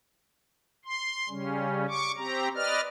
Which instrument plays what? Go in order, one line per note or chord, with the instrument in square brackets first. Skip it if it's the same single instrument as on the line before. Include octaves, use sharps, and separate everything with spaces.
[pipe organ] C6
C#3 G3 C#4
C#6 D6
C4 G4 A#5
B4 D5 D#5 F6